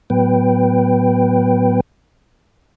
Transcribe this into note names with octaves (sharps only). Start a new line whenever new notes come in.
A2 F#3 B3 B4 G5